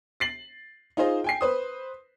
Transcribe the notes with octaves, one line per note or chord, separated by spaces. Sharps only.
A6 C7 F#7
D#4 F4 G#4 C5 D#5
G5 G#5 C7
B4 C5 D#6